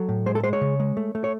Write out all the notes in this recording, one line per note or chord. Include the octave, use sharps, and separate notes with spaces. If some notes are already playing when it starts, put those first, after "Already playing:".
Already playing: F#3 A4
A2
G#3 C5
A4
G#3 C5
C#5
C#3
G#3
A3
A3
C#5